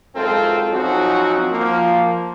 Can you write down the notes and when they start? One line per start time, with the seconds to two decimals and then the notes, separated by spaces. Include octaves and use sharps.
0.15 B1 F#2 G#3 C4 F4 A4
0.71 F3 F#3 C4 C#4 D#4 F#4
1.51 F3 A#3